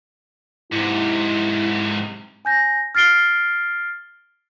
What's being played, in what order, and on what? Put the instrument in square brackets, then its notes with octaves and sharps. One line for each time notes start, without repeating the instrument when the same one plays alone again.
[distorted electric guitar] G#2 C3 [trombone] E4
[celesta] G#5 G6 A#6
F6 A6 C7 D7 G7